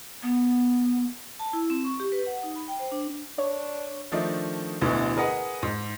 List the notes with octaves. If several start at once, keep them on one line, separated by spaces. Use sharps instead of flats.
B3
A5
E4
C4
C#6
G4
B4
F#5
D#4
B5
G5
C5
D4
D4 C#5
D#3 F3 A3 D4 D#4
A1 D2 B2 D3 E3
G#4 A#4 B4 D#5 F#5
G#2